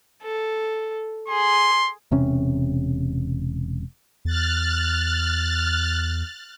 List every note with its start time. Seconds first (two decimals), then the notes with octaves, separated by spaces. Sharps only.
0.22 A4
1.28 G#4 C6
2.12 E1 C3 C#4
4.25 E2 F6 F#6 A6